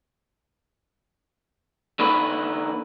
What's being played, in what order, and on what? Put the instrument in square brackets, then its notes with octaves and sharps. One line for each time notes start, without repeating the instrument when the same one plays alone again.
[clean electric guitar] D3 D#3 A#3 B4